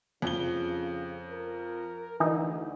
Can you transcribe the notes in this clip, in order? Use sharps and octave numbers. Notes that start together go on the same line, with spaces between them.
F2 C#3 G7
A#4
D2 E3 D#4